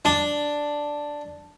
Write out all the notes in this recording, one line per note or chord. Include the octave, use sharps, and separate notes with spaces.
D4